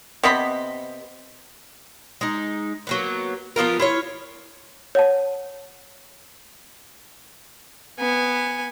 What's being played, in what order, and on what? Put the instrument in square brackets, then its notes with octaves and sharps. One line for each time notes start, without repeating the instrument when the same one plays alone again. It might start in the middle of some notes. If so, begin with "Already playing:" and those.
[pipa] C3 B3 D#5 B5
[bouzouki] G#3 D#4
F#3 A#3 B3
F3 B3 F4 A#4
E4 F4 C#5
[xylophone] C#5 F#5 A5
[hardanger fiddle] B3 G#5